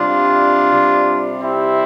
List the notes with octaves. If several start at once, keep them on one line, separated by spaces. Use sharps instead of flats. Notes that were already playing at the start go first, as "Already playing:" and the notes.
Already playing: C3 G3 D4 F4
C3 G3
C4 E4